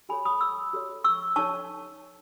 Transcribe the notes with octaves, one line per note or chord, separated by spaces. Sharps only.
F#4 A4 C#5 G#5 B5
B5 D#6
C#6 E6
F#4 A4 C#5
C#6 E6
D#4 A4 C#5 A5 C#6